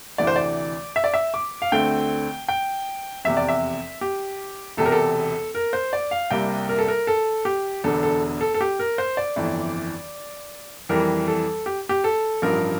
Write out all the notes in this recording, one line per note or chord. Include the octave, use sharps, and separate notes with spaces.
D2 C3 E3 D5
C5
D5
E5
D5
E5
D6
F5
D2 D3 A3 C4 G5
G5
F1 E2 C3 E5
D5
E5
G4
E1 E2 C3 A4
A#4
A4
A#4
C5
D5
F5
C2 C3 G3 A#3 G5
A#4
A4
A#4
A4
G4
E1 E2 D3 A4
A4
A4
A4
G4
A#4
C5
D5
G1 F2 E3
F2 E3 G3 A#4
A4
G4
G4
A4
A1 G2 F3 A#4